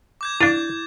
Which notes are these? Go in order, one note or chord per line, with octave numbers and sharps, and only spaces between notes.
D6 G6 G#6
D4 E4 F5 A6